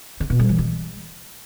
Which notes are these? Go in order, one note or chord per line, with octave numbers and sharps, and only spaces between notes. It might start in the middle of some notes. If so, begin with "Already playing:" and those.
C#3
B2
G3
E3
G#3